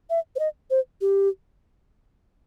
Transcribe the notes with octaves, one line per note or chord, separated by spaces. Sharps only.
E5
C5
D#5
C5
G4